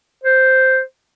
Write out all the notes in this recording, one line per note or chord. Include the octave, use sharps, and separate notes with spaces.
C5